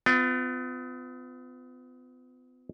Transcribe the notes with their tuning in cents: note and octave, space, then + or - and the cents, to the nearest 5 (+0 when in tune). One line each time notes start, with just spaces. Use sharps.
B3 +40 F4 +0